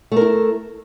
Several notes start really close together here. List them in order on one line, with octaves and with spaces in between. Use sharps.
A3 A#4 E4